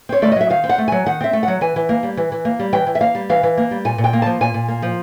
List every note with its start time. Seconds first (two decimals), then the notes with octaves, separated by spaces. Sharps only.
0.09 C4 C#5
0.22 A3 D5
0.32 D#5
0.36 F#3 E5
0.50 D#3 F5
0.64 C4
0.69 F#5
0.78 A3
0.88 F#3 G#5
1.06 D#3 F#5
1.21 C4 E5
1.33 A3
1.43 F#3 F#5
1.61 E3 G#5
1.76 E3
1.89 A#3
2.03 G3
2.17 E3
2.32 E3
2.45 A#3
2.59 G3
2.73 E3 G5
2.87 E3
2.95 E5
3.01 A#3 F5
3.15 G3
3.29 E3 F5
3.43 E3
3.57 A#3
3.71 G3
3.85 A#2 G#5
3.98 A#2
4.04 G5
4.13 A#3
4.22 F3 A5
4.41 A#2 G#5
4.54 A#2
4.68 A#3
4.82 F3